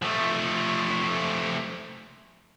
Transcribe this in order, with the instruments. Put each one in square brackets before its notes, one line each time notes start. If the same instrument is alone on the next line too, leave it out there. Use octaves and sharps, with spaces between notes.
[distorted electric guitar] F3 A3